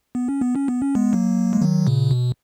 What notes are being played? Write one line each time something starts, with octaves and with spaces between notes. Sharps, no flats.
B3
C#4
B3
C#4
B3
C#4
G#3 B3
F#3 A#3
G#3
D#3 F#3
A#2 C#3
B2